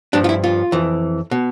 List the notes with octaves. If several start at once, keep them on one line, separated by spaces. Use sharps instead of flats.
G2 F3 D4
F4
E4
F4
F2 E3
B2